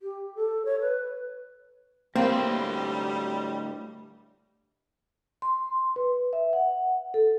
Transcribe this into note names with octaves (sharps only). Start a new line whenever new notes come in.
G4
A4
C#5
B4
A2 D3 G3 A#3 C4 B4
C6
B4
E5
F#5
A4